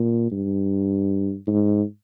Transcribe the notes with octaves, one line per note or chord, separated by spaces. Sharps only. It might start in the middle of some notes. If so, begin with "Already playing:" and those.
Already playing: A#2
G2
G#2